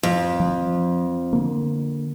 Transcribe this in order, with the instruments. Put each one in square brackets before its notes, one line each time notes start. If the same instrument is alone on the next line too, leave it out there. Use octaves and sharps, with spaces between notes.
[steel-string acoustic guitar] F2
[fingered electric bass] F3
D3 A#3